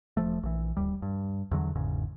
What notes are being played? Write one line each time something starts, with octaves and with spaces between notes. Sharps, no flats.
E1 F3 A3
A#1 E3
D1 D#2 G3
G2
E2 D3 F#3
G#1 E2 G#2 C#3